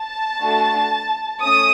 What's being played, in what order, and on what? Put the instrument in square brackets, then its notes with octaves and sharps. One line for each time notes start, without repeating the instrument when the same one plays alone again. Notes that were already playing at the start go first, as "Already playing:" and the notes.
Already playing: [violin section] A5
A3 D4 F#4
A3 C#4 D#6